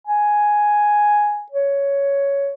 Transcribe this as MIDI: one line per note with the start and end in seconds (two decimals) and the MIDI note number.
0.07 1.44 80
1.51 2.54 73